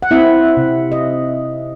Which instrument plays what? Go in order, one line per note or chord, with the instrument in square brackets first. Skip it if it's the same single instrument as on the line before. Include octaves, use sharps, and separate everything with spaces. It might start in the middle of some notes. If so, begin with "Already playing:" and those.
[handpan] F#5
C4 E4 E5
C3
D#5